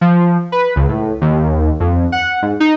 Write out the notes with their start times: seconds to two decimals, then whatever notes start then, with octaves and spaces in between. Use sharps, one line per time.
0.01 F3
0.52 B4
0.76 C#2
0.89 A2
1.22 D#2
1.80 F2
2.12 F#5
2.42 G#2
2.60 D#4